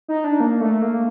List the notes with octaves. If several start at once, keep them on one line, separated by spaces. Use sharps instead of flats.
D#4
D4
A#3
A3
A#3